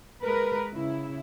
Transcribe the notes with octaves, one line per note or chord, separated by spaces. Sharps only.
G#3 A#4 B4
C#3 E4